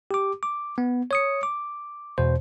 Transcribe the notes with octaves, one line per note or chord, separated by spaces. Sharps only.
G4 D6
D6
B3
C#5 D#6 C#7
D6
E2 B2 C5